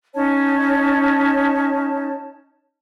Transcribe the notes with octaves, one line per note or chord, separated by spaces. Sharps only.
C#4 D#4 C#5 A5